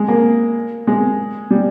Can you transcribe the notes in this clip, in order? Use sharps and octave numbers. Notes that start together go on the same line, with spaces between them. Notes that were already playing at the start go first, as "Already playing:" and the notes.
Already playing: G#3
A#3
G#3
G3